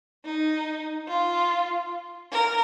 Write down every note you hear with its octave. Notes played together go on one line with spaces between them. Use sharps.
D#4
F4
A#4